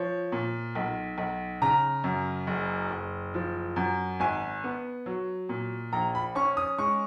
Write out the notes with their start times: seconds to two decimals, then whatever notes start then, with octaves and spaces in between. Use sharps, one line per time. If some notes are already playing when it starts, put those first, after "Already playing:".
Already playing: F3 C#5
0.32 A#2
0.75 B1
1.18 B1
1.62 C#3 A#5
2.04 F#2
2.47 F#1
2.91 F#1
3.34 F3
3.76 F#2
4.20 G#1 G#5
4.64 B3
5.06 F#3
5.49 A#2
5.92 A#1 A#5
6.15 B5
6.35 C#4 C#6
6.57 D#6
6.78 G#3 C#6